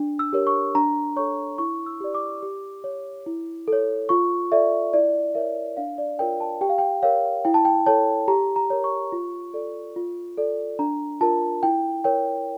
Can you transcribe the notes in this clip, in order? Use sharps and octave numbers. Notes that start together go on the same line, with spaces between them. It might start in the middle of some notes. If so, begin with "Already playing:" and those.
Already playing: D4
E6
G4 A#4 C#5
C#6
D4 A#5
A4 C#5 C#6
E4 C#6
E6
G4 D5
D6
G4
C#5
E4
A4 C#5
F4 C#6
A4 D5 E5
E4 D5
A#4 C#5 E5
D4 F5
D5
F4 A#4 C#5 G5
A5
G4 G5
F5
G5
A#4 C#5 F5
E4 G5
A5
G5
A4 C#5 A5
G4 A#5
A#5
A#4 C#5
C#6
F4
A4 D5
F4
A4 D5
D4 A#5
F4 A#4 A5
E4 G5
A#4 C#5 G5